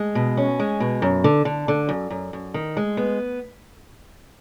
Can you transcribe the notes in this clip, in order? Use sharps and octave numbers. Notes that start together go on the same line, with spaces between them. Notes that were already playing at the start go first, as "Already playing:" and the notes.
Already playing: G#3
B2
C#4
G#3
B2
F#2
D3
D3
D3
F#2
F#2
F#2
D#3
G#3
B3